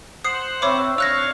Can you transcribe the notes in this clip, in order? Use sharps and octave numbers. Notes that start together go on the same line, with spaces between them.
C5 F#5 D#6 C7
C4 C#5 E5 B5 C#6 D6
D4 C#5 F5 E6 F#6 A#6